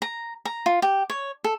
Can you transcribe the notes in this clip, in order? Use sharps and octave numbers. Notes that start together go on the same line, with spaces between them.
A#5
A#5
F4
G4
C#5
A4